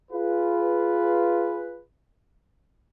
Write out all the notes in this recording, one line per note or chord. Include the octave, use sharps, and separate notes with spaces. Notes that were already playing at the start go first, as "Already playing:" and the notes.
F4 G#4 B4